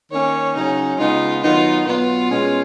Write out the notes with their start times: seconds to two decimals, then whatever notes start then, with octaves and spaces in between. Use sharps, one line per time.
0.11 D#3 A#3 C#4 C#5
0.54 C#3 F#3 C#4 D#4
0.99 C#3 G#3 B3 D#4 F4
1.42 D#3 F#3 B3 D#4 F4
1.86 B2 F#3 B3 F4
2.31 B2 G#3 C#4